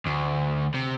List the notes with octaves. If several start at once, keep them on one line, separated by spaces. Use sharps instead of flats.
D2
C3